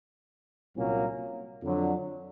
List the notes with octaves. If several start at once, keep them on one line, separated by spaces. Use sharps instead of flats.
C2 A#2 F#3 A#3 C#4
F2 D3 F#3